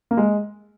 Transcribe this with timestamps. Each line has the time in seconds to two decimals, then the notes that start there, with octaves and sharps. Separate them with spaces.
0.11 A#3
0.17 G#3